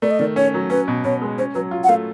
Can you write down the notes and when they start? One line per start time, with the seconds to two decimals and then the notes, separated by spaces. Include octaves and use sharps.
0.02 A3 D5
0.11 D#5
0.19 D#3 D5
0.36 C#4 C#5
0.54 F#3
0.70 C#4 B4
0.88 B2
1.04 B2 C#5
1.22 G#3
1.38 C#4 C5
1.55 F#3 B4
1.71 F4
1.84 F#5
1.89 A3 F5